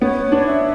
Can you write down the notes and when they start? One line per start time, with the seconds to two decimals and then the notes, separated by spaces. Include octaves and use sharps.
0.01 B3 C#5
0.32 D4
0.46 E5